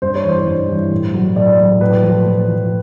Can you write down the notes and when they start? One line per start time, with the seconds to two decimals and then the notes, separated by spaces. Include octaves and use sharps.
0.02 G2 C5
0.15 C#5
0.24 E3 C5
0.47 G2
0.69 E3
0.91 A2
1.14 F#3
1.36 A2 D5
1.58 F#3
1.81 A2 B4
2.03 F3
2.26 A2
2.49 F3